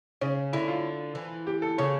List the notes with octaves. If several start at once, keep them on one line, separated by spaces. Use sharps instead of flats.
C#3 C#4
D3 E4
F4
E3
G4
A4
C#3 C#5